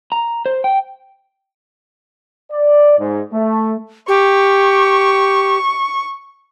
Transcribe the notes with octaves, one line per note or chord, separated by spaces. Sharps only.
A#5
C5
G5
D5
G#2
A3
G4 C#6